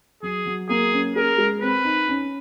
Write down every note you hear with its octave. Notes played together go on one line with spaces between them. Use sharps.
F#3 G#4
F#3
A#3 G#4
C#4
G#4 A#4
G#3
C4 B4
D#4
C#4